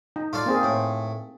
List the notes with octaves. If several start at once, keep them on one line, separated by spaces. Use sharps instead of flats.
D#4
F4 A4 D5
A#3 C4 G#4
A2